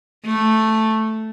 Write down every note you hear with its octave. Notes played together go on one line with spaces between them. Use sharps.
A3